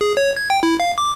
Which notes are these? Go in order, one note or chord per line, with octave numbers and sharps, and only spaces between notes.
G#4
C#5
G#6
G5
E4
F5
D6